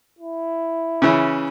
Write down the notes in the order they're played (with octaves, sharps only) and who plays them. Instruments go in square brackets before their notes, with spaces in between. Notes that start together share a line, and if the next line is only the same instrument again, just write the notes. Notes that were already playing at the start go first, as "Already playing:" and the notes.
[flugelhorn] E4
[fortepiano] C#3 E3 C#4